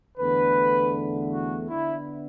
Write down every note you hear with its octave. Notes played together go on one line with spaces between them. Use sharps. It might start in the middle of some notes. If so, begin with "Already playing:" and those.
E2 D3 A3 D4 B4
F#4
D3 B3 D4 E4